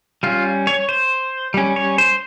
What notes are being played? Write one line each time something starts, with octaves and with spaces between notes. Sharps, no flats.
G3 C#4 F4
C#5
C5
G3 C#4
C#5
C5